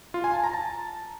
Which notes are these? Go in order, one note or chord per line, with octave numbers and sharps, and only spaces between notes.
F4
G#5
A5
A#5
A5